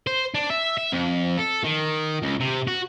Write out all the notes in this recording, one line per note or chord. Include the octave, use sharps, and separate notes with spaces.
C5
D4
E5
E5
F2
A4
D#3
C#2
C3
F#4